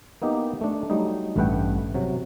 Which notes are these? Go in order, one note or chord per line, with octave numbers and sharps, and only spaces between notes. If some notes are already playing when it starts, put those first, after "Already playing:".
A#3 B3 D#4 E4 G4
A3 D4
F#3 G3 A3 D#4
A1 G2 A3 B4 F#5 G5
C3 F#3